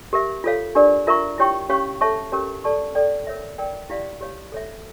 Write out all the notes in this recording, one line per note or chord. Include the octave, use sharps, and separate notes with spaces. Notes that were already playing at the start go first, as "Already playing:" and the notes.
G4 A#4 E5
F4 A4 C#5 F5
D4 G4 A#4 D5
F4 A#4 E5 A#5 C#6
E4 G4 C#5 G5 C#6
C#4 G4 C#5 F5 C#6
A4 C#5 E5 A5 C#6
C#4 G4 A#4 C#5
A4 D5 A5 C#6
A4 D5 G5
A#4 C#5 E5
A#4 D5 G5
E4 G4 D5 F5
G4 C#5 F5
A4 C#5 E5